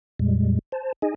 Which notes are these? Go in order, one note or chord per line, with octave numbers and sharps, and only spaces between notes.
F2 A#2 G3 G#3
C5 A5
D#4 G#4 D#5 G#5